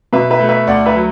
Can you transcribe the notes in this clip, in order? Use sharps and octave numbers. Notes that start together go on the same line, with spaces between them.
B2 B4 E5
B4 E5
A3
B4 E5
D2 D5 F#5
B4 E5
F#3